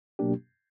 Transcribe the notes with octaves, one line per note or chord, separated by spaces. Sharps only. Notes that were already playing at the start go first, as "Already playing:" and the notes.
B2 F#3 A#3 D4 G4